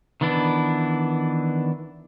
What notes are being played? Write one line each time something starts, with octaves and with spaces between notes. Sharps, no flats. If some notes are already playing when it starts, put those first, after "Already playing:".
D#3 E3 B3 D4 E4